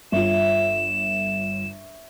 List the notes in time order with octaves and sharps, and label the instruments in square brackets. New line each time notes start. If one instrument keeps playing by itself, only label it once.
[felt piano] G1 F4 [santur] C#5 E5 [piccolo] E7